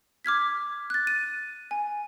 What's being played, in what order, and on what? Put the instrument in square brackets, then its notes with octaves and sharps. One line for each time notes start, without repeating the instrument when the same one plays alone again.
[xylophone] D6 F6 G#6 B6
F#6 A6
D#7
G#5